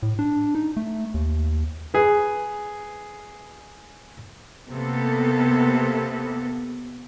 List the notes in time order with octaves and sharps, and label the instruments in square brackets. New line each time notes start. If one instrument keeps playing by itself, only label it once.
[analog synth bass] A2
D4
D#4
A3
D#2
[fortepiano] G#4 B4
[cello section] C3 A#3 B3 A4